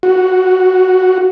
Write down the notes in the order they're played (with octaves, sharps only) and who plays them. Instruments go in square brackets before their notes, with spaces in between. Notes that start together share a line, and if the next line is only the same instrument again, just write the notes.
[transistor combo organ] F#4